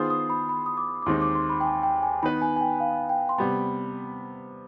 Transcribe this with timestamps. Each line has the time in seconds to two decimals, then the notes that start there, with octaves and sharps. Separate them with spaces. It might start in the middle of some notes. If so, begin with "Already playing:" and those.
Already playing: D#3 B3 F4 G#4 C5 D#6
0.10 D#6
0.30 B5
0.49 B5
0.66 D#6
0.77 D6
1.02 D6
1.06 D#2 D#3 G#3 C4 D#4 C6
1.22 D6
1.35 C6
1.50 B5
1.60 G5
1.65 G#5
1.83 G5
2.03 G#5
2.23 D#3 B3 D#4 B4 B5
2.42 G#5
2.56 G#5
2.61 G5
2.80 F5
3.09 G5
3.29 C6
3.38 C3 G3 B3 B5